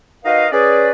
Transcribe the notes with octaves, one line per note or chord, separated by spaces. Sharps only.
D#4 F#4 A#4 B4 D#5 F5
C#4 G#4 B4 D5